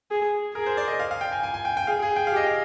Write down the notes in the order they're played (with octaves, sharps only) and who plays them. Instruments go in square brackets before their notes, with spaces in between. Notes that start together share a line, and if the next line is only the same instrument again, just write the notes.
[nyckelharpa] G#4
[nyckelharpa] G#4 [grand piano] A#4
[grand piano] C5
D5
D#5
F5
F5
G5
G#5
G#5
G#5
G5
G5
[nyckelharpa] G#4 [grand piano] F5
[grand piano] G#4
G5
[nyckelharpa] G4 [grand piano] F5
[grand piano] D#5
F5